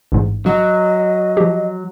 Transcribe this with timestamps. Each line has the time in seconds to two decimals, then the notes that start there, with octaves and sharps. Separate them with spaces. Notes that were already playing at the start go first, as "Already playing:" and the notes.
0.12 A1 G#2
0.46 F#3 D#5
1.37 F3 G4